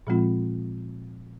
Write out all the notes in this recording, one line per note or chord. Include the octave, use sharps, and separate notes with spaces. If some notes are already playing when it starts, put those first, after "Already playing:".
A#2 F3 G#3 C4 F4